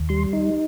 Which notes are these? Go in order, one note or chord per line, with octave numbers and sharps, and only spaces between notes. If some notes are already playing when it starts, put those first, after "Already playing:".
Already playing: D#2
G3 C6
D#4